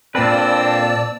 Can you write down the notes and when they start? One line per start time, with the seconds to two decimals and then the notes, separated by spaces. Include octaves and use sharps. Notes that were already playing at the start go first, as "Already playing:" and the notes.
0.15 A#2 D3 A#3 C4 B4 D5 A5 E6